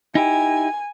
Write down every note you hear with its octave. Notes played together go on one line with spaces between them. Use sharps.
D#4 E4 G4 G#5